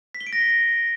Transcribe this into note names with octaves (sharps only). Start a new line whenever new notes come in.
B6
G7
D7
A#6